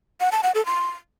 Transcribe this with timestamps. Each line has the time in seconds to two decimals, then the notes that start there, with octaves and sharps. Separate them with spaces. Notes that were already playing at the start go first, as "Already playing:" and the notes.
0.20 F#5
0.32 A5
0.43 F#5
0.55 A4
0.66 C6